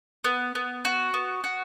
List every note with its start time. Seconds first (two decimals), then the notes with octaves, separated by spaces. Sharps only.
0.24 B3
0.55 B3
0.85 F#4
1.14 B3
1.44 F#4